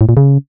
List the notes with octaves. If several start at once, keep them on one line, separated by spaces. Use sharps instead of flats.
A2
A#2
C#3